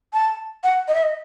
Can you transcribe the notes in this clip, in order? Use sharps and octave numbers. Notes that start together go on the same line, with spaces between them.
A5
F#5
D#5
E5
D#5